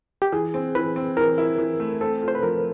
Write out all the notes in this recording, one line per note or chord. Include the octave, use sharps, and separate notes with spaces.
G4
E3 G#4
C4
E3 B4
C4
E3 A#4
E4
E3
A3
C4 A4
F4
C5
B4
F3 A#4